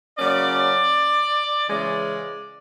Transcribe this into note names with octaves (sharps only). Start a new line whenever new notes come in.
C#3 F#3 A#3 C#4 D5
C#3 E3 G#3 C#4 D5